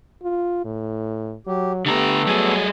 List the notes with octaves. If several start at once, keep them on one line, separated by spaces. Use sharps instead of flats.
F4
A2
F#3 G4
D3 A3 B3 G4 A4 A#5
F#3 G3 G#4